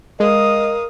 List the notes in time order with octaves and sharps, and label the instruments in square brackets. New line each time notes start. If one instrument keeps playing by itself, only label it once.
[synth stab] G#3 [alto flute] A#4 [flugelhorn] D#5 [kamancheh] F5 D#6